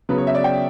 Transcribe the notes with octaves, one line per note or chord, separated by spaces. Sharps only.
C#3 F#3 B3 B4
C#5
E5
D5
G5